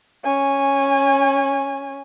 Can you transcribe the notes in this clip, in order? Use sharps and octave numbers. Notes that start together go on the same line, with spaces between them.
C#4 G#5